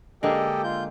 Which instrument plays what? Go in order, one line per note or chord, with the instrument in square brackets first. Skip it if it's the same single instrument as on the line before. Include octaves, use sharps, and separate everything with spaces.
[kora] D3 G#3 A#3 [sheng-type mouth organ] G4 A4 D#5
[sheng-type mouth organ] F4 G6